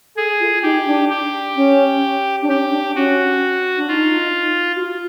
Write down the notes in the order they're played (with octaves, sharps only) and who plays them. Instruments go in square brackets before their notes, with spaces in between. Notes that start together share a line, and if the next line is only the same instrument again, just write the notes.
[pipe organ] G#4 [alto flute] A4
[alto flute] F4
[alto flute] D#4 [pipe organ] G4
[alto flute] D4
[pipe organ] G4
[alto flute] C#4
D4
[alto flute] C#4 [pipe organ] G4
[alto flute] D4
[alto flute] C#4 [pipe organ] F#4
[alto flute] D4
[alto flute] D#4 [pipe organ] F4
[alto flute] F#4
F4